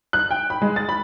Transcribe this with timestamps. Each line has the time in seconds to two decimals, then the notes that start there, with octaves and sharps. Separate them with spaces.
0.13 F#6
0.31 G5
0.50 B5
0.62 G#3
0.76 A6
0.89 B5